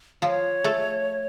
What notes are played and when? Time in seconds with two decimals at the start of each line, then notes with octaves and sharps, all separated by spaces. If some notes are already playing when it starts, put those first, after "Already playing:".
0.22 F3 F4 C#5
0.64 A3 A4